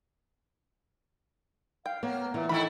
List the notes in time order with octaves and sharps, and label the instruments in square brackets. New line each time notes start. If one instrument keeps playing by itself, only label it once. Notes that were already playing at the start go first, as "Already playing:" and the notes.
[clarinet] F5 [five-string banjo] G5
[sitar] A#3 [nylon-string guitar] B3 [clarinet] C#5
[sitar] A#2 [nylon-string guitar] E3 [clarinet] E5
[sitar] D#3 A3 E4 [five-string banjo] B5